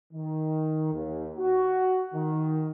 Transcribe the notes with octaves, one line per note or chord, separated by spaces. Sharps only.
D#3
D#2
F#4
D#3